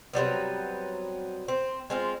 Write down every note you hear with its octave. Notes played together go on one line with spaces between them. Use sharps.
C3 F#3 G3 B3
C4
G#3 C4 F4